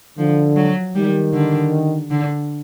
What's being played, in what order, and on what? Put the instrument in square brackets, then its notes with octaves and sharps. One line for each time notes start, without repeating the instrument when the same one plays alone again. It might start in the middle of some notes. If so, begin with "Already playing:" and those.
[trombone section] D3 [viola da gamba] F3
[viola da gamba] F#3
[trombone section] D#3 [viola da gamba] G3
[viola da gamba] D3
D3